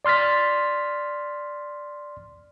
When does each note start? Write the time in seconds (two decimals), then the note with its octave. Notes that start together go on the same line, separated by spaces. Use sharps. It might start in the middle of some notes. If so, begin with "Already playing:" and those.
0.05 D5 C6 F6 A6 B6